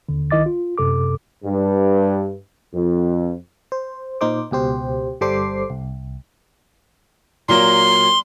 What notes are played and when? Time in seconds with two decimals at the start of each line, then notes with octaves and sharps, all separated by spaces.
0.09 D#2 D3
0.31 C2 D#3 E4 D#5 D6 A6
0.46 F4
0.78 F#2 C3 A4 D6
1.45 G2
2.74 F2
3.72 C5
4.21 A#2 D#4 C5 D6
4.51 C#2 B2 G4 C5
5.21 G1 G3 A4 C5 D6 C7
5.70 C2
7.49 A#2 F#3 A#3 C6